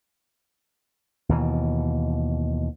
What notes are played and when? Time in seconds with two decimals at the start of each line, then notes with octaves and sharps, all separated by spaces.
1.29 D#2 B2 E3